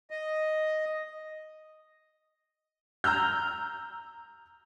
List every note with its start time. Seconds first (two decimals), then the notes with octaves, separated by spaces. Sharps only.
0.10 D#5
3.04 A#5 E6 F6 G6